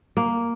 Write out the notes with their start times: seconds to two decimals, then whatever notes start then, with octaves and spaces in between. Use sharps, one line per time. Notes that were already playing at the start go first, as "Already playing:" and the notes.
0.17 A#3